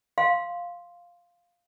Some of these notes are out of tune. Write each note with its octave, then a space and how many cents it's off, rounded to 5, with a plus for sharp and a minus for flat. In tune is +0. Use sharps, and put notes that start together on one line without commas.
F5 +0 C6 +0